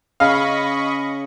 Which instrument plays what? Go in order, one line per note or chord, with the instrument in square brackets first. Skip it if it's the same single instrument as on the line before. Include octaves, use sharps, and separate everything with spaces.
[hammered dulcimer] C#3 [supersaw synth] D#5 B5 C#6 [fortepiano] F5